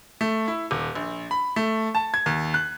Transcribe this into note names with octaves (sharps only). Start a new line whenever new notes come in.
A3
E4
D#1
A#1
B5
A3
A5
G#6
D#2
F#6